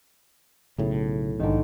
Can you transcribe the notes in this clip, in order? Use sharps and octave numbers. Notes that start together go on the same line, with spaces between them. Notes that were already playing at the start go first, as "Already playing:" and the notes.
B1 A2 C#3
A#1 G#2 D3 D#3